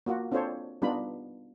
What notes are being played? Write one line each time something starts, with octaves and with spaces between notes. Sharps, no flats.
A#3 F4 F#4
C4 D4 F4 A4 C5 C#5
G3 B3 D4 D#4 F4 B5